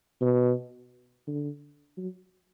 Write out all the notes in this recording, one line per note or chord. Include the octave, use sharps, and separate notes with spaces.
B2
D3
F#3